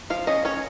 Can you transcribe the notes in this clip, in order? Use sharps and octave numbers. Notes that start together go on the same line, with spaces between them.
F3 F5
C#4 D#5
C#4 C#5